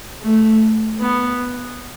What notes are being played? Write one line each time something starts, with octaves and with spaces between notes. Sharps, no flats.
A3
B3